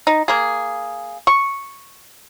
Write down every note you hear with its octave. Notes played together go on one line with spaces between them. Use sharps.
D#4
A#3 G#4
C#6